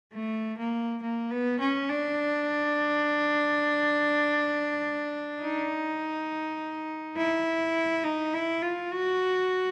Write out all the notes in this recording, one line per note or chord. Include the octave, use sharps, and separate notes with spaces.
A3
A#3
A#3
B3
C#4
D4
D#4
E4
D#4
E4
F4
F#4